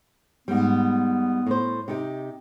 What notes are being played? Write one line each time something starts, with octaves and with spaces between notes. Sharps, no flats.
G#2 G3 B3
A2 C5
C3 D#4 G4